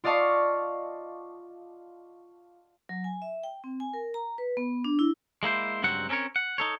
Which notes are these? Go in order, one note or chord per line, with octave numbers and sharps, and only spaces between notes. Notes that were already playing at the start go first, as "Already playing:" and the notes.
F4 D5 D#5 F5 A5 C#6
F#3
G#5
E5
G5
C4
G#5
A#4
A#5
B4
B3
D4
E4
G#3 A#3 E4 C5
C#2 G2 F#3 C4 F#5
C4 C#4 A4 A#4 C#5
F#5
D#4 A4 C#5